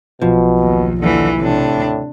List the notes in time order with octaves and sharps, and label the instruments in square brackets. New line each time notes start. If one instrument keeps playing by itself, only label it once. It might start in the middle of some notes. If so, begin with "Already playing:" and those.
[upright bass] B1 [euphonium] B2 [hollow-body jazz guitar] F3
[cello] D#2
[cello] D#2 E3 [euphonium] D3
[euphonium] A2 [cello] C3 D4
[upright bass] D#2 C#3